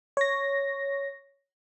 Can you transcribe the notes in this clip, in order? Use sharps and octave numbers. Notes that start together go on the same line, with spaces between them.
C#5 A#6